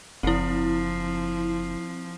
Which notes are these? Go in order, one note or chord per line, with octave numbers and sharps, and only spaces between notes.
F#1 F3 C4 E4